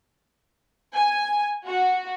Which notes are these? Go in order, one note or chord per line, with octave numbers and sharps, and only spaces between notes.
G#5
F#4